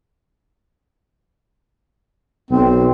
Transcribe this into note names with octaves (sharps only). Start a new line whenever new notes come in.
B1 C4